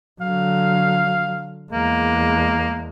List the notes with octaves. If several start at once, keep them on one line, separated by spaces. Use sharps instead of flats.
D3 F#3 F5
E2 G#3 A#3